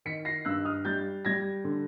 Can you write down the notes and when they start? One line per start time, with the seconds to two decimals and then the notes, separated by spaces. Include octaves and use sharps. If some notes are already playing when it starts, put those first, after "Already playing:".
0.05 D#3 B6 C#7
0.25 A#6 C7
0.45 G2 E6 F#6
0.65 D#6 F6
0.85 G3 G6 A6
1.25 G3 G#6 A#6
1.64 D3